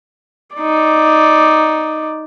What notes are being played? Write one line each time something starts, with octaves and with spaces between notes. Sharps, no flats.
D#4 D5